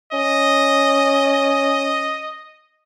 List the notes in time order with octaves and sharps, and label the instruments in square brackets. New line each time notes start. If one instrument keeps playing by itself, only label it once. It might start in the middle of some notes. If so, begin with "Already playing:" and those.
[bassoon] C#4 [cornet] D#5